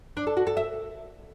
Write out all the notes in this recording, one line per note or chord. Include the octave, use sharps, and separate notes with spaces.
D4
A4
F#4
A4
E5